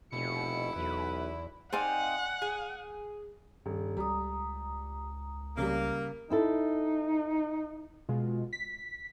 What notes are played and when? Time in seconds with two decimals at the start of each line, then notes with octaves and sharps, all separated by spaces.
0.13 F1 B2 E4 C#7
0.76 B1 E2 B4
1.73 C4 D#4 D5 F5 F#5 G#5
2.42 G#4
3.66 D#1 G2
3.97 C#2 G3 A#5 D#6
5.57 C#3 G3 A#3
6.30 C4 D#4 E4 A4
8.09 B2 G#3 F4
8.53 B6